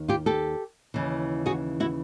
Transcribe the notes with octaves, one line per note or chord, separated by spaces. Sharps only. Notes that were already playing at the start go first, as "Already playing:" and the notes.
Already playing: D#2 D#3
F4 G4
G4 A4
D#2 C#3 E3
F#4 G#4
E4 F#4